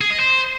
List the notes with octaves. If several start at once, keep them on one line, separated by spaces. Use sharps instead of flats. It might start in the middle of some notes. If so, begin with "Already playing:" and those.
G#4
D#5
C5